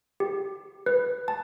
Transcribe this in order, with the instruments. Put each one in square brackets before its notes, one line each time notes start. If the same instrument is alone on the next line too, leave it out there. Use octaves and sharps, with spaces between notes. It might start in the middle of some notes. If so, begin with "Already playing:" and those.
[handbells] G4
B4
A5